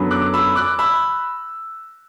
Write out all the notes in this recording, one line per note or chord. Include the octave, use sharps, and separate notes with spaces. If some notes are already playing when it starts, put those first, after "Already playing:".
Already playing: F#2 D3 F#3 B3
D6 F#6
B5 E6
D6 F#6
B5 E6